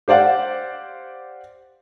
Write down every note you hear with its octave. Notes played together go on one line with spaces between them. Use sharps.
G4 C5 D5 F5 F#5